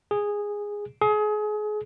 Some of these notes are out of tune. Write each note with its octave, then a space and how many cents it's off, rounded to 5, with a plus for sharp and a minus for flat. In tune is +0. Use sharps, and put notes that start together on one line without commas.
G#4 -10
G#4 +30